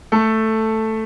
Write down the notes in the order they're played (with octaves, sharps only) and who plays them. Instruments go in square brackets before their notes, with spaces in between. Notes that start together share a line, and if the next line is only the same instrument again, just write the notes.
[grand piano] A3 A4